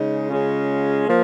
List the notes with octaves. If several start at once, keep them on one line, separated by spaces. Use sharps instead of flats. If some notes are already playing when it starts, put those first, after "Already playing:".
Already playing: C#3 G#3 D#4
C#3 G#3 C#4 F4
F3 A#3